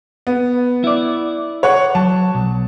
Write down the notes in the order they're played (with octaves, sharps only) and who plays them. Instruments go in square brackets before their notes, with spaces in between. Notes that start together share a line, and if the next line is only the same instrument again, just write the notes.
[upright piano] B3
[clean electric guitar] E4 D5
[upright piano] C#5 F#5 C#6
[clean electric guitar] F#3 [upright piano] A5
[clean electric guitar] B1